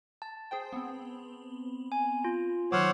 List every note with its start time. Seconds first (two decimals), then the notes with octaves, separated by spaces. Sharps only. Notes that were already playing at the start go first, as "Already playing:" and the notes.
0.22 A5
0.51 G#4 C5 G5
0.73 B3 C4
1.92 G#5
2.25 F4
2.72 D#3 F#3 C5 C#5 F#5 D6 E6 F6